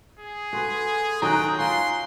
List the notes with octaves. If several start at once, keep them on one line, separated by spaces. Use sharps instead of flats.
G#4
F#4 A4 B4 G#5 C6
D#3 F#3 C#4 G5 A#5 D#6 F#6
F4 G#5 C6